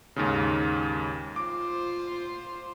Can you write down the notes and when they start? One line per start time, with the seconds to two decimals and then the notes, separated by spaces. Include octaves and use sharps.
0.16 D#2 G#2 C#3
1.36 F4 C5 D6